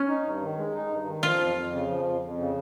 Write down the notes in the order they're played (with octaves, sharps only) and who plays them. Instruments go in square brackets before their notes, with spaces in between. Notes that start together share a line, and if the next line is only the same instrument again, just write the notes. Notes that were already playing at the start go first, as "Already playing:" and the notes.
Already playing: [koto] C#4
[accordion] D#4
G2
D#3
G#3
D#4
G2
D#3
[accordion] F3 [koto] F4
[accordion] F2
F2
C#3
F3
F2
F2
C#3